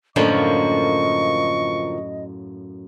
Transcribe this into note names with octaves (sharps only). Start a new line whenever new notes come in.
F#2 A2 D3 F3 A#3 F4 D#5 C#6